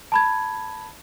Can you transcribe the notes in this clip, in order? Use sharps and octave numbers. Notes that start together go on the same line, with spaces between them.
A5 B5 G#6